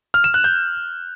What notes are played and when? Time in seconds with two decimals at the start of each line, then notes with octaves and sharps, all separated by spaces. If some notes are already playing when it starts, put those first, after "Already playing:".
0.14 F6
0.24 E7
0.34 F#6
0.44 G6